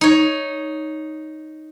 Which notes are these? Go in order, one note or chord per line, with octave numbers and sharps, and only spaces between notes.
D#4 C#5